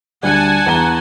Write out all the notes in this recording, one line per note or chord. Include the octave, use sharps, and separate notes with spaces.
D2 G3 F#5 G#5 A5
E2 A#5 G7